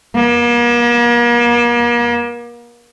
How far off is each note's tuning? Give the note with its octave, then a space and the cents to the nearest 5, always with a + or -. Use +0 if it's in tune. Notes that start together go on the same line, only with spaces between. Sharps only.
A#3 +40